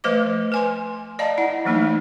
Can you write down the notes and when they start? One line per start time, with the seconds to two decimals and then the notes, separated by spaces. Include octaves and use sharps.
0.04 F3 A3 B4 C5 D#5 D6
0.52 B4 G#5 C6
1.19 D5 D#5 F5 A5 A#5
1.38 E4 F#5
1.65 E3 F#3 A3 A#3 D#4